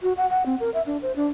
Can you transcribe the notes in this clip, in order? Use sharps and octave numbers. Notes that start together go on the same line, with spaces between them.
F#4
F#5
F#5
C4
A#4
E5
D4
C5
D4